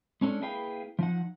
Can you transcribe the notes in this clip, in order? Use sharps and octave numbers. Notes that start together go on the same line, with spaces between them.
G#3 C#4 D4 A4
A#3 E4 G#4 B4 F5 G5
F3 D#4 F#5